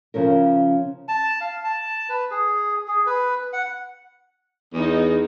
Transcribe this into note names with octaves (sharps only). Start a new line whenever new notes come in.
C#3 F3 C#4 A#4
A5
F5
A5
B4
G#4
G#4
B4
F#5
E2 D#4 G#4